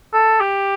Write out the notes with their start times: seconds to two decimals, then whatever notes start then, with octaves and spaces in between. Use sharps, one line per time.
0.13 A4
0.41 G4